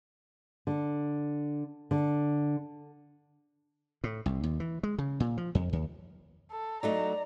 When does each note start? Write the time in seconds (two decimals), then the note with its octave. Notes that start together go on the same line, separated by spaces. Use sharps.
0.67 D3
1.91 D3
4.04 A2
4.26 C2
4.44 D#2
4.60 E3
4.83 G#3
4.98 C#3
5.20 A#2
5.38 F3
5.55 F2
5.73 D#2
6.52 A4
6.83 F#3 A3 D#4 D5 A#5